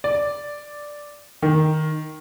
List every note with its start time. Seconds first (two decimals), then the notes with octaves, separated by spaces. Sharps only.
0.04 D5
1.42 D#3